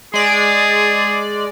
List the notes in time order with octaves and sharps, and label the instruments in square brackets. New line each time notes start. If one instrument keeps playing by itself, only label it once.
[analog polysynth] G#3 D5 [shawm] G#4